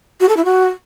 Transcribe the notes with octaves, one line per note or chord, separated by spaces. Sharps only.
F#4
A4
E4
F#4